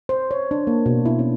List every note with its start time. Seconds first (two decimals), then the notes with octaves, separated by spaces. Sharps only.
0.09 C5
0.31 C#5
0.51 D4
0.67 A#3
0.86 B2
1.06 E4
1.19 C#4